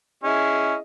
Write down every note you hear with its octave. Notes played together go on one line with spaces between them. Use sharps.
C#4 E4 G#4 D#5